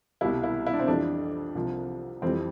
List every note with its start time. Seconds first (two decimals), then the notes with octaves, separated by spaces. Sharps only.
0.21 C2 B2 G3 E4
0.43 E4
0.66 E4
0.73 D4
0.79 C4
0.87 F2 E3 G3 D4
1.55 C2 C3 F3
2.22 F2 E3 G3 C4